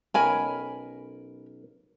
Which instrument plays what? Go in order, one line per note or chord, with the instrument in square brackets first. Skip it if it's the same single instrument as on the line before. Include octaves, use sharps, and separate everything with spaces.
[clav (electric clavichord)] B1 C#4 G5 [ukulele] A#4 G#5 B5